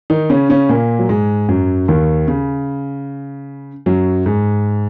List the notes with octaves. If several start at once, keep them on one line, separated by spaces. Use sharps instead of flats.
D#3 D#4
C#3 C#4
C#3 C#4
A#2 A#3
F#3
G#2 G#3
F#2 F#3
D#2 D#3
C#3
F#2 F#3
G#2 G#3